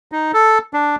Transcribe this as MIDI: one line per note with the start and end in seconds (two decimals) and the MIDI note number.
0.12 0.32 63
0.34 0.58 69
0.74 0.96 62